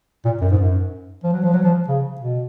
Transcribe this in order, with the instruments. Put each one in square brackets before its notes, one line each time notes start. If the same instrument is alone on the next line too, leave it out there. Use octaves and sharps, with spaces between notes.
[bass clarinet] A#2
F#2
G#2
F#2
F3
F#3
F3
F#3
F3
C#3
B2